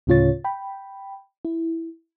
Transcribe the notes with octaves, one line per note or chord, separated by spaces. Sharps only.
D2 A2 C#3 F4 C#5 A6
G5 B5
E4